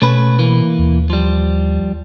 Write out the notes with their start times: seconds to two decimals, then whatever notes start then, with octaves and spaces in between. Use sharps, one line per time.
0.02 B2 A3 C#4 B4
0.39 E3 A#3
0.79 D#2
1.10 F3 G3